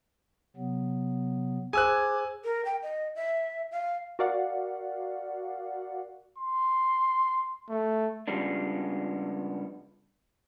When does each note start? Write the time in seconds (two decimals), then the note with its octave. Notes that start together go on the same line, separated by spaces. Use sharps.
0.57 C3 F#3 B3
1.73 G#4 C5 G#5 D6 E6 F#6 G#6
2.44 A#4
2.65 G5
2.83 D#5
3.16 E5
3.72 F5
4.19 F#4 A#4 D5 F5 F#5
6.38 C6
7.70 A3
8.28 C#3 F3 G3 G#3 B3 D4